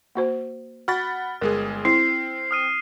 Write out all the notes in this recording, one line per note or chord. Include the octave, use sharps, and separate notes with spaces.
A#3 F#4 C5
F#4 F#5 B5 F6 A6
G1 G#3 G#4 A#4
C4 E4 C7
D#6 F6 D#7